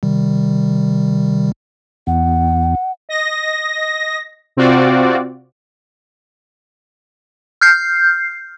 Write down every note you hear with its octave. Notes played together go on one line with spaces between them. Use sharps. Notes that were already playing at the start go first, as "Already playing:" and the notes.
C3 D#3 G3
E2 F#5
D#5 A#6
C3 C4 F4 F#4 D5
F6 G6 C7